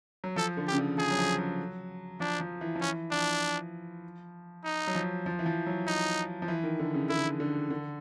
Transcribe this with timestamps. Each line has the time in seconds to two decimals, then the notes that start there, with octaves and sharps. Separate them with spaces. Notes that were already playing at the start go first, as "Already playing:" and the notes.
0.24 F#3
0.36 F3 A4
0.57 D3
0.68 G4
0.72 C#3
0.77 D3
0.98 F3 G#4
1.11 F#3
1.18 F3
1.39 F#3
2.20 F3 D4
2.40 F3
2.61 E3
2.76 F3
2.81 E3 C#4
3.11 F3 D4
4.64 D#4
4.87 F#3
4.95 F3
5.26 F3
5.39 E3
5.46 F3
5.66 F#3
5.87 D#4
6.42 F3
6.48 E3
6.64 D#3
6.79 D3
6.94 C#3
7.09 D3 E4
7.40 D3
7.70 D3